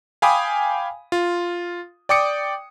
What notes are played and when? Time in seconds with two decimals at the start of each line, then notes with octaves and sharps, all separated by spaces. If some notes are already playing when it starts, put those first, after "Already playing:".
0.22 F5 G5 G#5 B5 D6 D#6
1.12 F4
2.09 D5 G5 D6 D#6 C#7